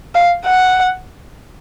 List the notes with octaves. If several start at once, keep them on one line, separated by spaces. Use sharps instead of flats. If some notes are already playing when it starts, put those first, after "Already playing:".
F5
F#5